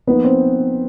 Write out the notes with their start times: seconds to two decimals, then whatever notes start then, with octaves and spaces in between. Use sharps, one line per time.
0.07 F3 A#3 B3 D#4 B4
0.24 C4 C5